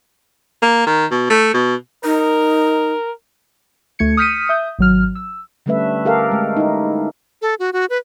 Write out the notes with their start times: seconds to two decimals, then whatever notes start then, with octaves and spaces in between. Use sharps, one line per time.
0.62 A#3
0.87 D#3
1.11 B2
1.30 A3
1.54 B2
2.04 D#4 A#4
3.99 D2 A3 G#6 C#7
4.17 D#6 F6 G6 B6 C#7 D#7
4.49 E5 D#6 G6
4.79 G#1 F#3 F6
5.15 E6
5.66 D3 G3 A3 C#4 B4 E5
6.05 G4 A4 A#4 F5
6.31 G#3 A3
6.57 D#4 E4
7.42 A4
7.59 F#4
7.73 F#4
7.90 B4